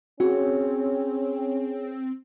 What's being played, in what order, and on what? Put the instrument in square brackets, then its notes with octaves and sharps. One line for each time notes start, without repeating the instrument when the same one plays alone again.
[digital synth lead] C4 [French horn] C#4 [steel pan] F#4 [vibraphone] G#4 C#5